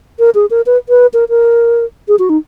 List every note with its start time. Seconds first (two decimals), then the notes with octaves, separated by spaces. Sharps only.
0.19 A#4
0.35 G#4
0.50 A#4
0.66 B4
0.89 B4
1.14 A#4
1.29 A#4
2.08 G#4
2.19 F#4
2.30 D#4